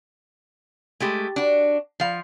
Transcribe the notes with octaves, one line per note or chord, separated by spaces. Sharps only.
G#3 A3 G4
D4 F#4
F3 F5